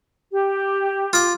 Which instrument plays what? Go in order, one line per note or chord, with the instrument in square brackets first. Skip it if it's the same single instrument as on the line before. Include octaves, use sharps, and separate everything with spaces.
[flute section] G4
[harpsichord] F4 D6